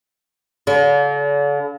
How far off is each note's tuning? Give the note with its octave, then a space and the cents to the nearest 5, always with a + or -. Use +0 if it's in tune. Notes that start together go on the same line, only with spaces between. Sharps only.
D3 -40